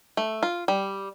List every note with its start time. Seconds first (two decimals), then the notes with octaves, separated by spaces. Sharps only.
0.17 A3
0.43 F4
0.68 G3